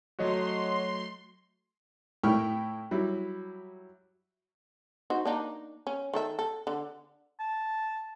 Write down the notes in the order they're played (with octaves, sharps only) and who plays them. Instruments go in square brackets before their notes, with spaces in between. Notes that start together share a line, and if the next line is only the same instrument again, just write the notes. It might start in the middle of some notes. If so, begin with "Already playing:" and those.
[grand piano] F#3 A3 [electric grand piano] F#4 C#5 D#5 [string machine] C6
[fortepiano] A2 E4 G5 C#6 F6
F#3 G3 E4
[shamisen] D#4 F#4 C5
A#3 D4 D#4
C#4
D#3 A4 E5
A4
D3
[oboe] A5